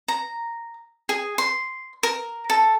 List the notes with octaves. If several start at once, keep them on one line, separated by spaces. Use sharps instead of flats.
A#5
G#4
C6
A#4
A4